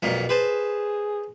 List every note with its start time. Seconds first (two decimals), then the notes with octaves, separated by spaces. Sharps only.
0.03 B1 F2 A#2
0.29 G#4 B4 C5 A5